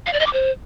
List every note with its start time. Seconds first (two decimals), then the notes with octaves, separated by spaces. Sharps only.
0.06 F5
0.13 D5
0.20 D#5
0.26 D6
0.33 C5